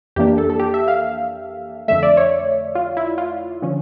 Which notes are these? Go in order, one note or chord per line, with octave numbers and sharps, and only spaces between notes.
F2 E3 A#3 D4 G4
A4
A4
G4
E5
F5
F2 D3 A3 E5
D5
C#5
F4
E4
F4
D3 F3 C#4